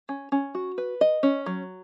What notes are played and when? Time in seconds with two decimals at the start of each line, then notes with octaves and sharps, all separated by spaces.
0.09 C#4
0.32 C#4
0.55 F#4
0.78 B4
1.01 D#5
1.23 C#4
1.46 F#3